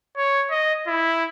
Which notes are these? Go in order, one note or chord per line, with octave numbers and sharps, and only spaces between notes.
C#5
D#5
E4